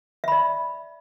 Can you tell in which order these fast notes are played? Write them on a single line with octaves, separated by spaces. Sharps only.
E5 B5 D5